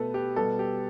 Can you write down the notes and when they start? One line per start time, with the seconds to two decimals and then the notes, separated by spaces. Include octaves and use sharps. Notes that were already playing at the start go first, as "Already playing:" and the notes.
Already playing: B2 A3 B3 A4 B4
0.14 G4
0.36 B2 G3 B3 A4
0.59 G4